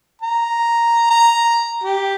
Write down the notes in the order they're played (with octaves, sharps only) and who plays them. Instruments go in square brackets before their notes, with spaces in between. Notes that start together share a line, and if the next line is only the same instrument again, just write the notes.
[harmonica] A#5
A#5
G4